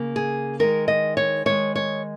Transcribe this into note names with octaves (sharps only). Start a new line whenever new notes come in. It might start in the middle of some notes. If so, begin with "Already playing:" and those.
Already playing: C#3 A#3
G#4
D#3 G#3 A#4
D#5
C#5
D#3 G#3 C#5
C#5